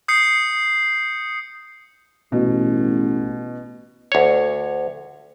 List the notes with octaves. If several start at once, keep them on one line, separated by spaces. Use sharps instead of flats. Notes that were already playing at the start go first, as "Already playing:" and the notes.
D#6 G6 C7 C#7
A1 B2
D2 C#5